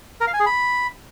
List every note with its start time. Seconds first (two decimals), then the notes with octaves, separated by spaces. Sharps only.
0.21 A#4
0.27 F5
0.33 G#5
0.40 G#4
0.46 B5